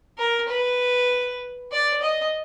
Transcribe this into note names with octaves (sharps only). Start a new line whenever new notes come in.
A#4
B4
D5
D#5